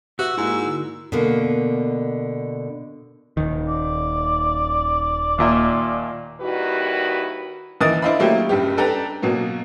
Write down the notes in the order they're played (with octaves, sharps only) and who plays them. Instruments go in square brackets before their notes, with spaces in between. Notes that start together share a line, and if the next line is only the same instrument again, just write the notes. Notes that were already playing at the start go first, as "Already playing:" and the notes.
[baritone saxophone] F#4 [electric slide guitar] G4 B4 E5 [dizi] E6
[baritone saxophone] G#2 [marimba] A#3 D#4 A#4 [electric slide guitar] E4 F#4
[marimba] D3
[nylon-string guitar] B2 D3 A#3
[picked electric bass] D#1 D#3
[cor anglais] D5
[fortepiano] D#2 A#2 E5
[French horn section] D#2 D#3 G3 E4 F#4 B4
[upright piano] D#2 E3 A#4 D#5 D#6 A6
D4 E4 C5 D#5 F5 B5
F#3 A3 A#3 E4 G4
F#1 G2 G3 G4
D4 A4 B4 G5 A5 A#5
B2 F#3 A#3 B3